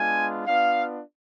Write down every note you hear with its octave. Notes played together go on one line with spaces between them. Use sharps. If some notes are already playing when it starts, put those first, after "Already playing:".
Already playing: G#3 B3 D4 F4 G#5
B3 D4 F4 F5